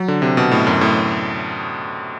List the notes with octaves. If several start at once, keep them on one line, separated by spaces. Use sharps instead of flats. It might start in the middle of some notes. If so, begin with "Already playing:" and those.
Already playing: F#3
D3
C3
B2
A2
F#2
A2